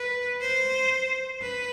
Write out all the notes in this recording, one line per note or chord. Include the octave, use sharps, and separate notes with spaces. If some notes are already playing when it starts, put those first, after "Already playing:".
Already playing: B4
C5
B4